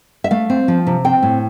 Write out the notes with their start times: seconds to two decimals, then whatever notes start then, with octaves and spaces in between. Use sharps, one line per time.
0.24 E5
0.31 A3 F5
0.50 C4
0.68 F3
0.87 C3
1.05 C4 G5
1.22 A2